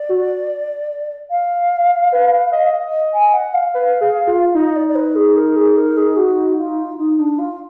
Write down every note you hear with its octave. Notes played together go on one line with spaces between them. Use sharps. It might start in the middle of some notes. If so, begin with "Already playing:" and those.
Already playing: D5
F#4
F5
B4
D#5
G#5
F#5
F5
B4
G#4
F4
D#4 D#5
D5
D5
B4
G#4
A#4
G#4
A#4
G#4
F#4
F4
D#4
D4
F4